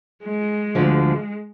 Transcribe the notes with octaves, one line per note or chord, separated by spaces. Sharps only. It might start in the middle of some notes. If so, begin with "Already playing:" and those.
G#3
D2 D3 F3